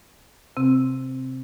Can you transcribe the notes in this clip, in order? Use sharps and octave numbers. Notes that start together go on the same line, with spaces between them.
C3 C4